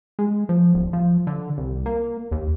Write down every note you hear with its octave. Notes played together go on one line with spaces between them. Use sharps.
G#3
F3
D1
F3
D3
C2
A#3
D#2